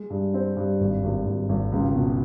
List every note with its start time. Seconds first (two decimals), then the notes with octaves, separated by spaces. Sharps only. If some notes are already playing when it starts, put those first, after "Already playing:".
Already playing: G#3
0.10 G2
0.34 C4
0.57 G2
0.81 G#1
1.03 G#1
1.26 G#1
1.49 G#1
1.72 C#2
1.95 B2